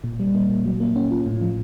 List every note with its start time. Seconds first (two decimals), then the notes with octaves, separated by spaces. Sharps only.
0.04 A#2
0.20 G3
0.34 A#3
0.49 A#2
0.65 F#3
0.80 A#3
0.96 C#4
1.11 F4
1.26 A2
1.41 F3